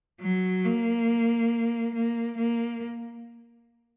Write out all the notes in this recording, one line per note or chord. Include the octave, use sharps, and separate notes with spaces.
F#3
A#3
A#3
A#3